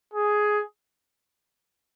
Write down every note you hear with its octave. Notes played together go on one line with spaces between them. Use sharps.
G#4